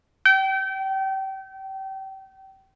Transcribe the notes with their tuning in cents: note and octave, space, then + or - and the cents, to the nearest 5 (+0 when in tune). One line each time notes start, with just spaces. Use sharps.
G5 -30